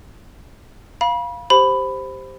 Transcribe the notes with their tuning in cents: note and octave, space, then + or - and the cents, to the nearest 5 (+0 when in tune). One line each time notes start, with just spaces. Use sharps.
F5 +0 B5 -35
G4 +0 C5 +0 B5 +10